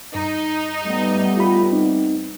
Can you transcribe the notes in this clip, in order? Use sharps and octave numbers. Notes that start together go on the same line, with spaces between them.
G2 D#4
G3 A3 B3
F4 G4 B5
C4 D#4